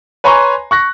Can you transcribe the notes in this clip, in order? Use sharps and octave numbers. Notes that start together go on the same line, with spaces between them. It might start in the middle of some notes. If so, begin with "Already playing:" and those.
B4 C#5 G#5 A#5 C6 C#6
C#6 F#6 A#6